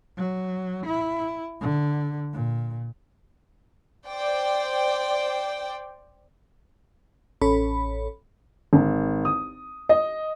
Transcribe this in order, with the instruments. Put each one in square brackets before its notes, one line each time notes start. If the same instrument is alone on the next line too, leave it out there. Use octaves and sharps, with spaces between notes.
[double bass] F#3
E4
D3
A#2
[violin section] C5 D5 G5
[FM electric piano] A1 C#4 A4 C#5 B5
[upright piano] G#1
D#6
D#5